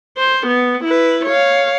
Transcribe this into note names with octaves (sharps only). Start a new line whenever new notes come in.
C5
B3
E4 B4
C#5 F5